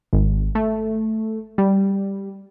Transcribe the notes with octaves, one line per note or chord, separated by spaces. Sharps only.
G#1
A3
G3